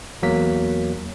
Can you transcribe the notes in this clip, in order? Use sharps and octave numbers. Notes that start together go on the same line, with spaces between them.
E2 F#3 A#3 B6